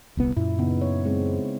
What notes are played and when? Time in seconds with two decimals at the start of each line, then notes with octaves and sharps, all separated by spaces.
0.17 D#1 C2 B3
0.37 F#2 A#2 E4
0.59 C#3 B3 D#4
0.81 C#5
1.05 G#3 C4